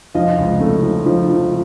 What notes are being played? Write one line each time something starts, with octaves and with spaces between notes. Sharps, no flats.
F3 D#5 F5
C#2
A3
F3
F3
F3